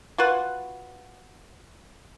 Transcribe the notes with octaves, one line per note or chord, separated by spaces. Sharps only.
F4 F#4 B4 F#5